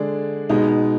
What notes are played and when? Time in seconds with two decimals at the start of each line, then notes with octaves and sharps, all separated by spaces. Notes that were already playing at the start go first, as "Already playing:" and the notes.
Already playing: D3 G#3 D4 G#4 D5
0.49 B2 G#3 D#4